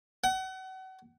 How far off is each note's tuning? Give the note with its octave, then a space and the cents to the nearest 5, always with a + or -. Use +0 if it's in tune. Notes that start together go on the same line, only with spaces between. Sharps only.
F#5 +35